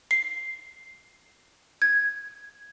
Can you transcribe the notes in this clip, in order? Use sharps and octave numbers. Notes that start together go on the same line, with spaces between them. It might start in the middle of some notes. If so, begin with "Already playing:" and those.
C7
G#6